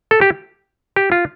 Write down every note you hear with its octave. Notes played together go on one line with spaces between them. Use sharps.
A4
G4
G4
F4